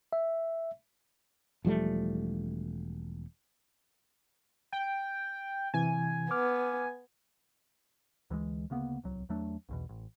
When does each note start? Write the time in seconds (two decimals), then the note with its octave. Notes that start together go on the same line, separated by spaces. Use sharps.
0.13 E5
1.65 E1 F3 G3 A3
4.73 G5
5.74 C3 E3 G#5
6.31 B3 D6 F6
8.30 D2 E3 F#3 G#3
8.70 D2 C#3 A#3 B3
9.04 D1 C2 F#3
9.29 E2 F#3 A3 D4
9.69 B1 E2 B2
9.89 A1